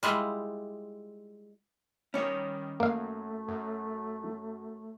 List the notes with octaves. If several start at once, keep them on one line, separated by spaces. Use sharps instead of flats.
G3 G#3 E4 F4
D#3 G3 C#4 C#5
F#2 A3 A#3 F5
F#2